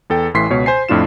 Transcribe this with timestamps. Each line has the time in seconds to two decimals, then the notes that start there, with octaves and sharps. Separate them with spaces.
0.10 E2 A4 G5
0.34 A1 A2 E3 C6 B6 C7
0.50 C#2 B2 C#5
0.66 C5 G#5 C7
0.89 F2 A2 D4 F4 E7